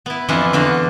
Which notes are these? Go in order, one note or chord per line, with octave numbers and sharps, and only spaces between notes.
B3 E4
F2 E3 D4 E4 F5 F#5
E2 D3 F#4 F5